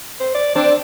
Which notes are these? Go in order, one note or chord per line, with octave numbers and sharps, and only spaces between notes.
C5
D5
C4 D4 D5